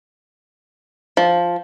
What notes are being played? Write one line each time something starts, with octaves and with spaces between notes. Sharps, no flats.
F3